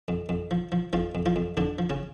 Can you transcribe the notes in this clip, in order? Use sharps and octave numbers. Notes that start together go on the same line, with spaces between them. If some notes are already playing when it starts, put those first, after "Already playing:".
F2
F2
F3
F3
F2 F3 F4
F2
F3 F4
F2
F2 D3 D4
F3
C#3 C#4